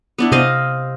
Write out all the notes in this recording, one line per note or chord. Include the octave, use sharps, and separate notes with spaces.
B3 D4 E4
C3 C4 D#5 F5